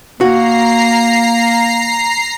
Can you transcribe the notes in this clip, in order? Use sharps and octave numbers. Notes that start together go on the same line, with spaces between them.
A#3 F#4 A#5 C7